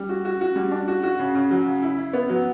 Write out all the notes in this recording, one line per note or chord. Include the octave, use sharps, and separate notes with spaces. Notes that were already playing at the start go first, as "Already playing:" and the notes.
Already playing: G3
F#4
F#4
F#4
G3
D4
F#4
F#4
C#3
C#3
F#3
C#3
E4
E4
B3
F#3